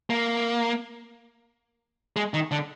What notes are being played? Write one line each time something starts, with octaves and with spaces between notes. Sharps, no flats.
A#3
G#3
D#3
D3